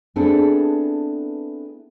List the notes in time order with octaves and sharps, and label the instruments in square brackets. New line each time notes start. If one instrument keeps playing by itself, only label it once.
[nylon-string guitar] B3 C4 D4 E4 G#4 A4